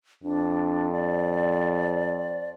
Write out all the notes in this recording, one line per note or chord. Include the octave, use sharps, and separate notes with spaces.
F2 D4
D5